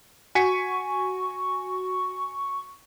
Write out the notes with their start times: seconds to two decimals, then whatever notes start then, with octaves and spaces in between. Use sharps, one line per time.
0.35 F#4 G#5 C#6 B6 C#7